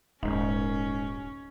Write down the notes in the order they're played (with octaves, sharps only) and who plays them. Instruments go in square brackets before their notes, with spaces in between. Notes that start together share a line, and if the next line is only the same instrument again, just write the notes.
[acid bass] D#1 [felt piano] G#2 [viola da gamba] C#4